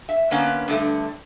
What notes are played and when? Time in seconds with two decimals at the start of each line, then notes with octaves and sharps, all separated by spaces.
0.09 E5
0.31 D3 A#3 B3 C#4
0.68 G2 D3 A3